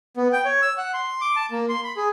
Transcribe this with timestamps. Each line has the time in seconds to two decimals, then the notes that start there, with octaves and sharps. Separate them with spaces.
0.17 B3
0.33 G5
0.45 C#5
0.62 E6
0.78 F#5
0.94 C6
1.21 D6
1.36 A5
1.51 A#3
1.69 C6
1.84 B5
1.96 G#4